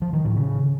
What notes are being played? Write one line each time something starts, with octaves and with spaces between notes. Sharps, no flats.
F3
D#3
A2
C#3